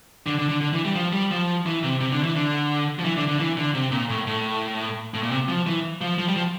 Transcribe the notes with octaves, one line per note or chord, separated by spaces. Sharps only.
D3
D3
D3
D3
E3
G3
F3
G3
F3
E3
C3
C3
D3
E3
D3
F3
E3
D3
D3
E3
D3
C3
A#2
A2
A2
A2
A#2
C3
F3
E3
F3
F3
G3
F3